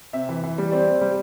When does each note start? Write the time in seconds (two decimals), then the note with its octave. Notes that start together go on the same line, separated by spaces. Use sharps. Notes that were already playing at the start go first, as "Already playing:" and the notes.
0.13 C3 E5
0.29 E3
0.44 E3
0.58 G3
0.72 C4 D5
0.87 C4
1.01 G3